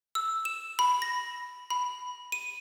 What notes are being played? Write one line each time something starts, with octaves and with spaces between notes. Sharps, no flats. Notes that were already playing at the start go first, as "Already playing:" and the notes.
E6
E7
B5
A#6
B5
D#7